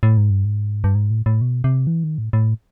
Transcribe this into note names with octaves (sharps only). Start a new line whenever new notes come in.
A2
G#2
G2
G#2
G2
G#2
A2
A2
B2
C3
E3
D#3
A2
A2